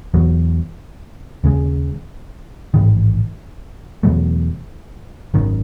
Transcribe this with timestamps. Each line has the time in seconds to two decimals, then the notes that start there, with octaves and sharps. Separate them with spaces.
0.14 E1 E2 B2 F#3
1.44 D#2 C#3 G#3
2.74 A1 G#2 D#3
4.03 E2 B2 F#3 A3
5.34 G#1 F#2 D#3